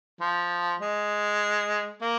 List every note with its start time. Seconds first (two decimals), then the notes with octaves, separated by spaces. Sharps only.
0.20 F3
0.80 G#3
2.02 A#3